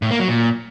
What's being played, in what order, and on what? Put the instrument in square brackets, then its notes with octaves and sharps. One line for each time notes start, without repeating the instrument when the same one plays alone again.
[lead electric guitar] A2
A#3
F#3
A#2